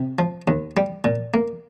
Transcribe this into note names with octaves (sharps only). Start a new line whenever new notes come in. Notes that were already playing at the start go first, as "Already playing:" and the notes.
Already playing: C3
F3
D#2
G3
A#2
A#3